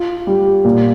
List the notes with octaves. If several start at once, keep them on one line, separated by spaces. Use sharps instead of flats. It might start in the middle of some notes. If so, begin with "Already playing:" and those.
Already playing: F4
G3
A#2